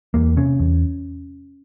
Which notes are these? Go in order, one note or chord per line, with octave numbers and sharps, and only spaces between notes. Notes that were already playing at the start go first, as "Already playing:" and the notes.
E2 A#3
C3 C#4
E2